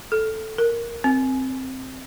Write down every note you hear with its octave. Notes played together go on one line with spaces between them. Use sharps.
A4
A#4
C4